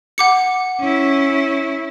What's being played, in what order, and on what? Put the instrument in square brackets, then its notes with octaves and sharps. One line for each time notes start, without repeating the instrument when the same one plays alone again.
[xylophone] F#5 D6 C#7
[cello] C#4 E4